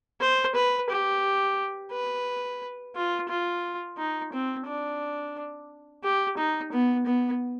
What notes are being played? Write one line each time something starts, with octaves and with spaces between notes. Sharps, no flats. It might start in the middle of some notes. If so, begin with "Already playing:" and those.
C5
B4
G4
B4
F4
F4
D#4
C4
D4
G4
D#4
B3
B3